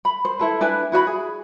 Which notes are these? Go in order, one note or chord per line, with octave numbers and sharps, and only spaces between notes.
B5
C5
E4 A4 B4
D4 E4 B4 G#5
E4 F#4 D#5 B5
G#4